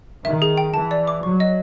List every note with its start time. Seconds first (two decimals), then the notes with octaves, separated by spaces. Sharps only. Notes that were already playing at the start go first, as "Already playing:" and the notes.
0.24 D#3 E5
0.42 G#4
0.57 G5
0.73 E3 A5
0.91 D5
1.07 D6
1.23 F#3 C#6
1.40 D#5